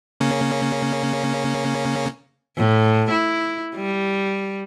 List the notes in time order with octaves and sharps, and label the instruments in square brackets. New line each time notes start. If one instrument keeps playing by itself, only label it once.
[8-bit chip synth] C#3 A#3 C#4
[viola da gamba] A2
E4
G3